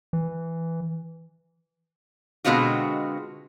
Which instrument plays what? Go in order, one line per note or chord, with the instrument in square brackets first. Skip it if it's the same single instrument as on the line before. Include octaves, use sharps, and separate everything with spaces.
[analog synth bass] E3
[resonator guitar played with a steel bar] B2 D3 G#3 C4 F4 F#4